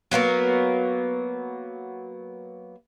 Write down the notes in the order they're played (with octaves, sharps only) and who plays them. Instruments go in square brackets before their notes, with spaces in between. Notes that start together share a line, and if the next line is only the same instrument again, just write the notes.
[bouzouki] F#3 A#3 B3 A#4